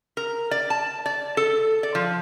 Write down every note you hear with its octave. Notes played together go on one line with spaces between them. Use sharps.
A#4
D5
A5
D5
A4
D5
F3